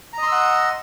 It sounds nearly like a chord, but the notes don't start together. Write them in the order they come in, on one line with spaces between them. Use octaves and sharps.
A#5 D#5 C6 E6 F#5